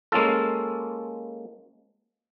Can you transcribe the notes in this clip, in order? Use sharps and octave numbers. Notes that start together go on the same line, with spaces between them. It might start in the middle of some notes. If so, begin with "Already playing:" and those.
G#3 A#3 C#4 F4 A4